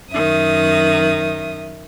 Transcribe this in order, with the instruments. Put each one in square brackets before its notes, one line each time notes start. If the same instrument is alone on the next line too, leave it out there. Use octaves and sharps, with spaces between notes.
[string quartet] F#2 D#3 E5 D#6